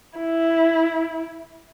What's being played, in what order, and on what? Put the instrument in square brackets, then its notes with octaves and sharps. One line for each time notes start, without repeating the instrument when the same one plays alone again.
[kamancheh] E4